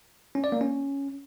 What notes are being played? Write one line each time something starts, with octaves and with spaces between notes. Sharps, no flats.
C#4
D5
A#3
C#4